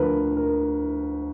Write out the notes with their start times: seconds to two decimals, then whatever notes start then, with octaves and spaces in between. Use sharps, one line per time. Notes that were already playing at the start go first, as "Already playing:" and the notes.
Already playing: D2 D3 F3 A#4 B4
0.36 A#4